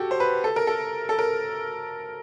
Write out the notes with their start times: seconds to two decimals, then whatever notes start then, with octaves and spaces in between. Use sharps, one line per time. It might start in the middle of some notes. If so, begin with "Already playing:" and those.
Already playing: F#4 G4 A4
0.11 C5
0.20 B4
0.44 A4
0.56 A#4
0.67 A4
1.09 A4
1.19 A#4